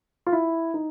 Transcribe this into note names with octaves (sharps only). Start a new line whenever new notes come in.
F4
E4
D#4